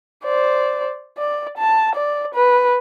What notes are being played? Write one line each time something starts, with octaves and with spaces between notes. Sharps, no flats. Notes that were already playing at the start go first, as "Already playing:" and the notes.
C5 D5
D5
A5
D5
B4